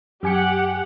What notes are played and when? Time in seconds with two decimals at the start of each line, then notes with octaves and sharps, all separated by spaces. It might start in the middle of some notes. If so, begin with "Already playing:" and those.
0.23 F#2 G4 F#5 G#5 C#7